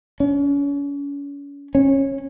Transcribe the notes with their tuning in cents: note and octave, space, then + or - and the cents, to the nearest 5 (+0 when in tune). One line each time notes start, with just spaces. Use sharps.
C#4 +35
C#4 -20